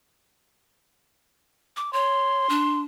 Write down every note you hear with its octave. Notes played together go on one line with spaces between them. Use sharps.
D6
C#5 C6
D4